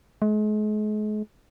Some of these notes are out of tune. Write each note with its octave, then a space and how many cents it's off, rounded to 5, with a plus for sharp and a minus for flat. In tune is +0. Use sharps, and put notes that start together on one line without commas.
G#3 +40